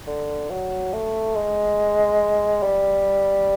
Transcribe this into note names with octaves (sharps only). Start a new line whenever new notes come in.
D3
F#3
A3
G#3
G3